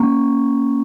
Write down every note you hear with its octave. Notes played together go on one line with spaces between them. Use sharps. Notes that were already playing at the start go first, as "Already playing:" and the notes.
Already playing: A#3 C#4